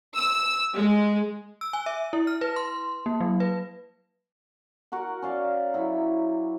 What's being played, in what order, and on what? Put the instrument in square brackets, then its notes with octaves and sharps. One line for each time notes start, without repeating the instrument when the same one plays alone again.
[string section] E6
G#3
[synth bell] E6
G#5
E5
E4
F6
B4
C6
A#3
F#3
B4
[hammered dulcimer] F#4 A#4 F#5
C#4 D5 F5
F#3 E4